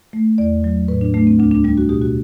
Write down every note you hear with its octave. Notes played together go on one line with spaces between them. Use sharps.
A3
E2 D5
F#3
A2 B4
D4
A3 D4
C4
D2 D4
D4
G3 D4
F#4
B2 G4
F#4